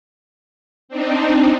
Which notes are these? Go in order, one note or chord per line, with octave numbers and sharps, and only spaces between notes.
C4 D4 D#4